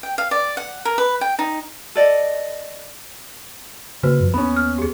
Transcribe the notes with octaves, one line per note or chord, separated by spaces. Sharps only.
G5
F5
D5
F#5
A#4
B4
G5
D#4
A4 D5 D#5
C#3 A#3 F#4 B4 C5
F#2 D#3 F3
D#2 B3 C#4 B5
F6
G4 G#4